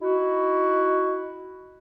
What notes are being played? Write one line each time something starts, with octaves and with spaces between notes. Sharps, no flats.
D#4 E4 F#4